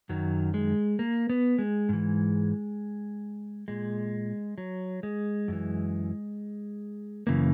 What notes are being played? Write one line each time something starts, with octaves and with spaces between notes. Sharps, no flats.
F#2 D#3 F#3
G#3
A#3
B3
G#3
G#2 E3
A#2 G#3
F#3
G#3
F#2 E3
F#2 C#3 E3 A#3